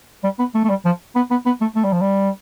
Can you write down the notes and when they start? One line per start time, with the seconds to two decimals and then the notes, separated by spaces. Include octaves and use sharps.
0.24 G3
0.39 B3
0.55 A3
0.65 A3
0.70 G3
0.85 F3
1.16 B3
1.31 B3
1.46 B3
1.61 A3
1.76 A3
1.84 G3
1.93 F3
2.01 G3